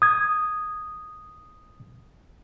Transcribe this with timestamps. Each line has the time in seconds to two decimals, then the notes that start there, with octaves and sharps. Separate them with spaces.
0.02 D#6 G#6